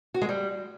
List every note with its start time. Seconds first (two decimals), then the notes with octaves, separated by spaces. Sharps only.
0.14 F#4
0.22 G#3
0.29 G3